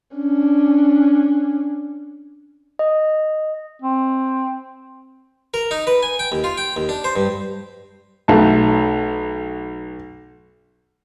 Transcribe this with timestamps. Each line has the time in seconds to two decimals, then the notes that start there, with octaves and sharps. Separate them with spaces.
0.16 C#4 D4
2.79 D#5
3.82 C4
5.54 A#4
5.71 D#4
5.87 B4
6.03 G#5
6.19 G5
6.32 D#2
6.44 F4
6.58 G5
6.76 D#2
6.89 D4
7.04 C5
7.16 G2
8.28 B1 A3 A5